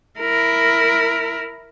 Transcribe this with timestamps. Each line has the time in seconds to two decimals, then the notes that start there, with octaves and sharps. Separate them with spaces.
0.19 E4 A#4